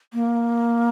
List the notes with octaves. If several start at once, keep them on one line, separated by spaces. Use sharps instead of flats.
A#3